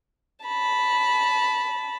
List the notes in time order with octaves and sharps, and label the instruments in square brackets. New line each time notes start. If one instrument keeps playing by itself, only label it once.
[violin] A5 B5